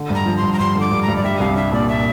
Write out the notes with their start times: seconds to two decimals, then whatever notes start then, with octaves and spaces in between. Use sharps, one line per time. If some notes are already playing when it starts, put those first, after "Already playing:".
Already playing: D3
0.10 G2
0.15 A#5
0.26 F3
0.37 G2 C6
0.53 A#5
0.59 G2 C6
0.75 D3
0.80 D6
0.91 G2
1.03 A#5
1.08 G2
1.16 D5
1.24 G3 E5
1.40 C2 F5
1.56 D4 E5
1.72 A#2 D5
1.89 E5